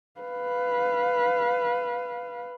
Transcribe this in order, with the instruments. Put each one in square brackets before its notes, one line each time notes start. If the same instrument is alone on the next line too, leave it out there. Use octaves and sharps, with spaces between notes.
[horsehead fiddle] B4 F5